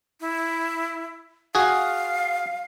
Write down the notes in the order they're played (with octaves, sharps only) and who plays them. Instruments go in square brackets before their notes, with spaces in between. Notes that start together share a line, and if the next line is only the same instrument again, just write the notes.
[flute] E4
[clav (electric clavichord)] F#4 G#4 [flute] F5